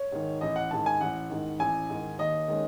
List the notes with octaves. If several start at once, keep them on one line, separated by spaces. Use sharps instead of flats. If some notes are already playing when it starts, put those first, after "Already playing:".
Already playing: C#5
G#2 D#3
A1 D#5
F#5
G#2 D#3 A5
G#5
A1 F#5
G#2 D#3
A1 G#5
G#2 D#3
D#2 D#5
D#3 G#3 C#4